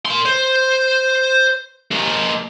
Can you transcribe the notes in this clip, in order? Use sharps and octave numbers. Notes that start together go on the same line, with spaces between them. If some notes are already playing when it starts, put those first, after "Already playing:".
A#4 C6
C5
G#3 A#3